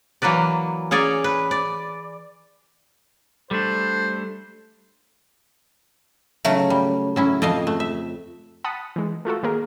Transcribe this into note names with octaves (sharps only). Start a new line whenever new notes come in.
E3 F#3 A#3 B4 D5
C#4 G#4 C#5 D5 A#5
B4
D5
G3 A3 D4 A4 C5
C#3 F#3 A3
G3
F#3 C#4 E4
F2 A4 D#5 F5
A3
E5
F#5 A5 B5 D#6
E3 G#3
A3 F4 F#4 A4
D#3 A#3 G#4 A#4